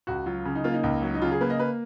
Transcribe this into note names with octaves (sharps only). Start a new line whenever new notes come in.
C#2 F#4
F#3 F4
C#3
D#4
A#3 F4
D#4
C#2
F#3
D#4
C#3 F4
G#4
A#3 B4
D#5
B4